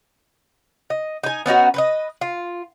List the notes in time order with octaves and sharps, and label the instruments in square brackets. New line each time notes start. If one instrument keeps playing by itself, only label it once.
[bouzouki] D#5
D#4 G#5
B3 C#4 D#4 F#4
B4 C5 D#5
F4